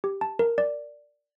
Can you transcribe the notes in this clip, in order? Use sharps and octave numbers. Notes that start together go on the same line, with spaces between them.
G4
A5
A#4
D5